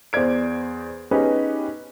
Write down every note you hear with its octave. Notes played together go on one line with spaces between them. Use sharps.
E2 C5 D5 G#6 D7
B3 C#4 D#4 G4 G#4 B4